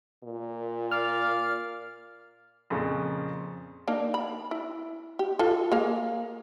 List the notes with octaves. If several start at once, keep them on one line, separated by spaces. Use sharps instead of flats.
A#2
D5 F5 F6
F2 A#2 C#3
A#3 D4 D#4
B5
E4
G4
F4 A4
A#3 G#4 F5